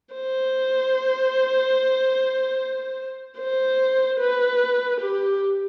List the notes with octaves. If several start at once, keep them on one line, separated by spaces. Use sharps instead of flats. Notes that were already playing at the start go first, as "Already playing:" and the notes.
C5
C5
B4
G4